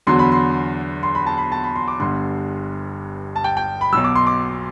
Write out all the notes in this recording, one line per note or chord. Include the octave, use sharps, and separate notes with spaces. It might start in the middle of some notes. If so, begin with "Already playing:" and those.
E2 D3 F#3 C6
B5
C6
C6
B5
A5
B5
A5
B5
C6
D6
G1 G2 D3 C6
A5
G5
G5
B5
B1 B2 F#3 E6
D6
C6
D6